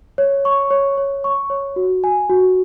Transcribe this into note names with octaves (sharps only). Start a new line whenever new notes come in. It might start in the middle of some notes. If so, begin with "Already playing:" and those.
C#5
C#6
C#5
C#5
C#6
C#5
F#4
G#5
F#4